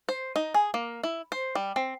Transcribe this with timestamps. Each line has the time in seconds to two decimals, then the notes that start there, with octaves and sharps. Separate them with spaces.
0.09 C5
0.36 D#4
0.54 G#4
0.74 A#3
1.03 E4
1.32 C5
1.55 G3
1.76 C4